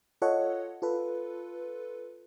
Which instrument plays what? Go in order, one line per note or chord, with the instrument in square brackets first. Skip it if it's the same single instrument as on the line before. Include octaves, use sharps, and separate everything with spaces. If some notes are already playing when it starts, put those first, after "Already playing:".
[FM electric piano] F4 A4 C#5 D#5 F#5
F4 A4 B4